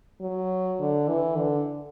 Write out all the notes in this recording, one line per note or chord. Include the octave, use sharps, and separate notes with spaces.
F#3
D3
E3
D3